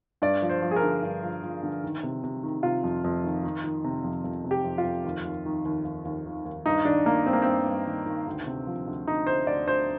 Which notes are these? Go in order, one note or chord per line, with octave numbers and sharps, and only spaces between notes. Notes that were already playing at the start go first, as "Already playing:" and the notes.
G2 D5
F3
C5
F3
G#4
A#4
D3
G2
F3
F3
D3
D#3
C3
C3
D#3
C3 F4
F2
F2
D#3
D#3
D#3
C3
F2
F2
C3
G4
F2
F4
F2
D#2
D#2
D#3
D#2
D#2
D#2
D#3
D#2
G2 D#4
D#3 D4
D#3 A#3
G2 C4
A#3
G2 C4
G2
D#3
D#3
D2
C3
F3
D2
D2 D#4
D2 C5
D2 D5
D2 C5